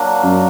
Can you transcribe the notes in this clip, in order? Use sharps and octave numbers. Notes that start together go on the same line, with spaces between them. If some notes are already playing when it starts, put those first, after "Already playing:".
Already playing: F#3 A#3 D4
F#2